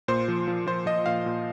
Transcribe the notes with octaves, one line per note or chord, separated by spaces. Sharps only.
A#2 C5
F3
F3
F3 C5
F3 D#5
A#2 F5
A#2